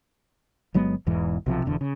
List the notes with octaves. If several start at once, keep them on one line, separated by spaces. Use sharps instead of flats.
G1 F#3 G#3 B3
E1 E2 G#2 E3
B1 C3 F3
E1 E2 D3
C#3